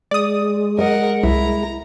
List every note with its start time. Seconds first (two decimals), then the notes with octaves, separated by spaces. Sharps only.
0.11 G#3 D5 D#6
0.78 A#4 D#5 F#5
1.23 C2 E4 A#5